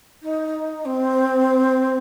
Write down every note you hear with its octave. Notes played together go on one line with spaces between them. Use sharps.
D#4
C4